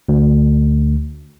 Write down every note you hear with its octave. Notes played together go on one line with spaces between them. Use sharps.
D2